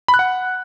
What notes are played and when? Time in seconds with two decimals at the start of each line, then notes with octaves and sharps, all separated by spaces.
0.08 B5
0.14 F#6
0.19 F#5